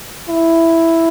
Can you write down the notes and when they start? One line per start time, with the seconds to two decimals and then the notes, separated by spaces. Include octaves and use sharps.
0.29 E4